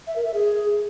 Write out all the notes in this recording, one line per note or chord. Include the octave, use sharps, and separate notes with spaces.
E5
A#4
E5
G#4